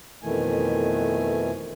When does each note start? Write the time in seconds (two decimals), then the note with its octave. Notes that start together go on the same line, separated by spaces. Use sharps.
0.23 F2 B2 D#3 E3 A3 G#5